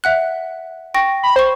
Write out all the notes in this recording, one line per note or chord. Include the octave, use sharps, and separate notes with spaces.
E5 F#5 F#6
G5 C#6 A#6
B5
C5 B5 C#6